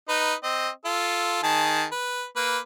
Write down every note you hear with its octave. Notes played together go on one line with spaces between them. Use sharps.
D#4 B4
C4 D#5
F4 A4
D#3 G#4 A5
B4
A#3 B4